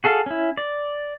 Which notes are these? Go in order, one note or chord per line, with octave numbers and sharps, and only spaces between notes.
F#4 G#4 A4 F5
C#4 E4
D5